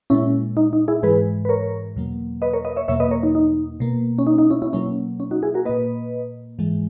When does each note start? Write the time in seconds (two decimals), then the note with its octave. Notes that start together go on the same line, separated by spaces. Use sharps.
0.10 A#2 G#3 C#4 E4
0.57 D#4
0.73 D#4
0.88 E4 G#4
1.03 G#2 E3 G#3 G#4 B4
1.45 B4
1.49 A#4 C#5
1.96 E2 B2 F#3 A#3
2.42 B4 D#5
2.53 A#4 C#5
2.65 B4 D#5
2.76 C#5 E5
2.88 E2 B2 F#3 A#3 C#5 E5
3.00 B4 D#5
3.11 A#4 C#5
3.23 D#4
3.35 D#4
3.80 B2 A#3
4.18 C#4
4.27 D#4
4.38 D#4
4.50 C#4 E4
4.62 C#4 E4
4.73 B2 F#3 A#3 C#4
5.20 C#4
5.31 D#4 F#4
5.43 E4 G#4
5.54 F#4 A#4
5.65 A#2 A#3 B4 D#5
6.59 G#2 E3 G#3